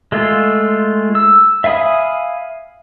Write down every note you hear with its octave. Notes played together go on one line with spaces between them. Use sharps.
G#3 A3 F4
E6
E5 F5 G#5 B5 D#6